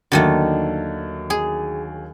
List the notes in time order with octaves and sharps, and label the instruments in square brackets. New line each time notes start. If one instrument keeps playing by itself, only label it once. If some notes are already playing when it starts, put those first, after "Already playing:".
[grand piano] D#2 F#3 [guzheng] D3 D#3 A3
[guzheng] G#4